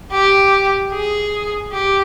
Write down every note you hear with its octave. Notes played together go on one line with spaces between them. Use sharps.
G4
G#4
G4